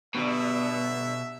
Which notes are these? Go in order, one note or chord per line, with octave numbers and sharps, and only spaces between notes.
G2 B2 D3 F#3 B3 E5